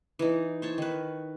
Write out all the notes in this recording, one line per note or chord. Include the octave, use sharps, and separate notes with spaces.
E3 D#4
C5 C#5 A5
D#3 B4